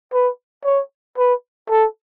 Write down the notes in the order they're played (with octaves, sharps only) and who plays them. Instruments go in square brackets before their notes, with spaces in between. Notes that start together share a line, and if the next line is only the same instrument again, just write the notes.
[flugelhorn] B4
C#5
B4
A4